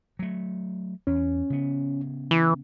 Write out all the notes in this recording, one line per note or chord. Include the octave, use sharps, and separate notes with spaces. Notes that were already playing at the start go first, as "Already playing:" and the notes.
F#3 A3
E2 C#4
C#3 B3
E3